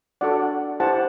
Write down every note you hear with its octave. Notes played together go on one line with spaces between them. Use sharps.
D4 F#4 A4 D5 F#5
E4 G4 C5 F#5 A5